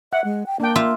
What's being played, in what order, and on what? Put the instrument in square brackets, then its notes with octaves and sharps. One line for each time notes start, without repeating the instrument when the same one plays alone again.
[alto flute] E5 [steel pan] F#5
[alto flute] G#3
G5
[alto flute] A#3 [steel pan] D4 G5
[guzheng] F4 E5